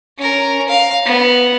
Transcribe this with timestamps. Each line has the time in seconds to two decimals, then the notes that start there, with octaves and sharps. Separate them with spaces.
0.17 C#4 A#4
0.69 F5
1.05 B3